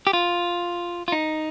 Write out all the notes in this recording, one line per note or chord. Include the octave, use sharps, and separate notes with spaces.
G4
F4
F4
D#4